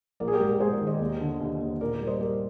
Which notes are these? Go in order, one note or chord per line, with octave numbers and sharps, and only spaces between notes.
A#1 A#4 D5
G#4
G4 A#4
G#2
G4 A#4
G#2 G#4 C5
A#4 D5
D#3
C5 D#5
D#2
D3
D#2
D#2
A#2 A#4 D5
A#4 D5
G3
C5 D#5
G3 A#4 D5